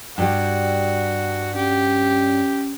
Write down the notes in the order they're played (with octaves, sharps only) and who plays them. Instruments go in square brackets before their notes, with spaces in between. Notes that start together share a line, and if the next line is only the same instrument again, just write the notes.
[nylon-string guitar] G2 G3 [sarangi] F#4
[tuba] C#4 [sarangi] G4